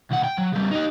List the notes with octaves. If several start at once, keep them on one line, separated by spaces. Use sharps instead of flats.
C#2 F#5
G5
F#3
C#3 G3
D#4 G4